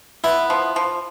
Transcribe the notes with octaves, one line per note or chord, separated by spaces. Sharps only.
B3 E4
F3
F3